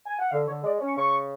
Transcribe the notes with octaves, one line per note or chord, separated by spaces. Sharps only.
G#5
F#5
D3 F5
D3 C#5
G#3 D5
D5
C#4
C#6
C#3 C#6